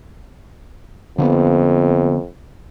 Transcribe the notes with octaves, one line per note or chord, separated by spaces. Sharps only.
F2 D3 A#3 B3